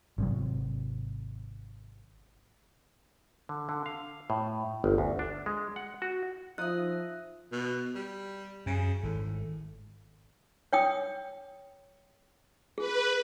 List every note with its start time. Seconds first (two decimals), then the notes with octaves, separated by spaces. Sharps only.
0.18 G#1 C3 F#3
3.49 D3
3.69 D3
3.86 F5
4.30 A2
4.84 G1
4.98 D2
5.19 D4
5.46 G#3
5.76 F#5
6.02 F#4
6.58 F3 D#4 F4 E5 D#6 F#6
7.52 B2
7.95 G3
8.66 F#2 C#3
9.03 G#1 A2
10.73 C#5 G5 D#6
12.78 G#4 B4